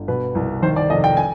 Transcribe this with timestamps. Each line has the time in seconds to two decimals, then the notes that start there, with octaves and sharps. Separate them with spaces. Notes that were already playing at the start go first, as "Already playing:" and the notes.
Already playing: G1
0.08 B2 B4
0.35 C2
0.62 D#3 C5
0.76 D5
0.90 F1 D#5
1.04 G5
1.17 G#5